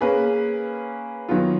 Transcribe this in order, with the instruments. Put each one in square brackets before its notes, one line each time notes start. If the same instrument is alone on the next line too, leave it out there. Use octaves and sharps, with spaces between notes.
[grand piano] A#3 C#4 G#4 B4
D#3 F#3 B3 F4